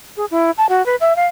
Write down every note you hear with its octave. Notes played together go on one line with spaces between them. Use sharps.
G#4
E4
A5
F#4
B4
E5
F5